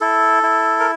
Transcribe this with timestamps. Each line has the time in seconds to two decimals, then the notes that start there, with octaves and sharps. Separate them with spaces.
0.01 E4 A4
0.43 E4
0.80 A#4